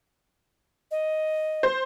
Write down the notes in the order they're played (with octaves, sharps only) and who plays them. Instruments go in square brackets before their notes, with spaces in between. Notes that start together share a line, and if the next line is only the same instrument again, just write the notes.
[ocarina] D#5
[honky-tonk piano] C5